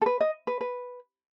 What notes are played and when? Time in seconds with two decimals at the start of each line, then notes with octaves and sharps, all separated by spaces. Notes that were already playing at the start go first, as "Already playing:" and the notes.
0.02 A4
0.06 B4
0.21 D#5
0.47 B4
0.61 B4